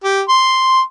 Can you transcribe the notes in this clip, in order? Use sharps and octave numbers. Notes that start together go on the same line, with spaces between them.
G4
C6